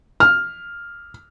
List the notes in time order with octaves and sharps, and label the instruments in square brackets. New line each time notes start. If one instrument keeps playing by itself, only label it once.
[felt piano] F6